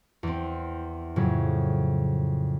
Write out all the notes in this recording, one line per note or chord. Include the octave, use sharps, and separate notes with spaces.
E2 C4
F2 A2 C#3 F#3